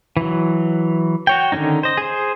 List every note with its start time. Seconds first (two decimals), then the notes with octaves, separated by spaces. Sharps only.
0.17 E3 F#3
1.27 F#4 C#5 G5
1.52 D3 D#3 G3 C#4 D#4
1.83 C5 D#5
1.97 G#4 C5